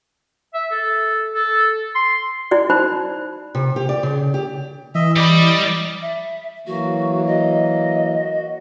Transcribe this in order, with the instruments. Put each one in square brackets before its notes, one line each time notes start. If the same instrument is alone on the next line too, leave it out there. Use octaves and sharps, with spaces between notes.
[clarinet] E5
A4
A4
C6
[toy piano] E4 F#4 D5
D#4 C5 B5
[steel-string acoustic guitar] C3
G4
D5
C#3
G4
[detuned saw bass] E3 [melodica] D#5 E5
[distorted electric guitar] G3 B5 [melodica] D5 D#5
[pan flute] E5
[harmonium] E3 F#3 A#3 [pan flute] F#4
[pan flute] D#5
[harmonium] F#4